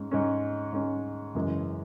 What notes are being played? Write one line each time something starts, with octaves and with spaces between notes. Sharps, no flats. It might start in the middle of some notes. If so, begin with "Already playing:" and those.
Already playing: G#2 G#3 C#4
G#2 G#3 C#4
G#2 G#3 C#4
F#2 C#3 E3 G#3